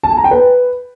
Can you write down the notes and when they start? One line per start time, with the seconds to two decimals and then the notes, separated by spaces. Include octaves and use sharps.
0.03 A5
0.10 G#5
0.17 A#5
0.24 G5
0.31 B4